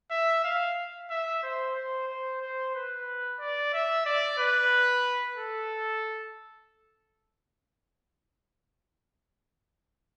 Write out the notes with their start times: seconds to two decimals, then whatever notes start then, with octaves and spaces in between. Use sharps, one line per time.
0.11 E5
0.44 F5
1.10 E5
1.43 C5
1.75 C5
2.08 C5
2.41 C5
2.75 B4
3.39 D5
3.73 E5
4.06 D5
4.39 B4
5.37 A4